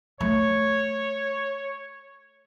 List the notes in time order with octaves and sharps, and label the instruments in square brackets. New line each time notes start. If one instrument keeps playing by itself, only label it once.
[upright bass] A3 [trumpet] C#5